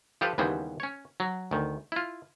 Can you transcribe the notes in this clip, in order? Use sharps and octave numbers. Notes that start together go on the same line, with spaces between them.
F3 G4 A4 B4 C5 F5
D#2 C#3 E3 G3 B3 C5
C#4 C#5
F#3
D2 D#3
E4 F4